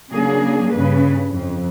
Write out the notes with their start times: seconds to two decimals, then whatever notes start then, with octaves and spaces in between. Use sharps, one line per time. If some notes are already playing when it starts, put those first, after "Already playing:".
0.12 C#3 F#3 A#3 D4 G#4
0.72 G2 C#3 B4
1.29 F2